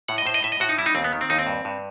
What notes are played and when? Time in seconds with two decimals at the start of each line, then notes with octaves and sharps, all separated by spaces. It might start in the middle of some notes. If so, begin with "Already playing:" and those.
0.08 A2 F#5
0.18 D#5
0.25 A2 C5
0.34 D#5
0.44 A2 E5
0.52 D#5
0.60 A2 F#4
0.69 D#4
0.78 G3 E4
0.86 D#4
0.95 D#2 C4
1.04 B3
1.13 D#3
1.21 C4
1.30 D#2 D#4
1.39 C4
1.47 G2
1.65 G2